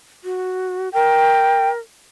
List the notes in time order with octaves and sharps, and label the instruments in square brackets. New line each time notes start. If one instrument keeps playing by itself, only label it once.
[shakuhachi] F#4
[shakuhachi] A#4 [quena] G5